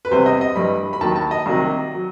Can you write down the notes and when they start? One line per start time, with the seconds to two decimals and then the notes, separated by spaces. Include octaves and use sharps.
0.05 B4
0.11 E2 C3 E3 G3 C5
0.26 D#5
0.41 D#5
0.56 G2 E3 G3 B5
0.93 B5
1.01 D#2 D#3 F#3 A5
1.16 A5
1.31 D#5
1.46 C2 C3 D#3 F#3
1.94 F#3